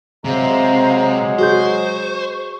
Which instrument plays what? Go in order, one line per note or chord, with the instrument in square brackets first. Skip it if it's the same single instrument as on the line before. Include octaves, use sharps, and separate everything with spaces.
[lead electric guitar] C3 [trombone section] F#3 G#3 [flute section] C5 F5 A#5
[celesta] F#4 G#4 G6 [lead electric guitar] C5 [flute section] C#6